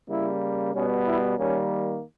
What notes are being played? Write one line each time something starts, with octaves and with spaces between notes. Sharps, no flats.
C#3 G3 A#3 E4
B2 G3 B3 C#4
E4
D#3 G3 A#3 C#4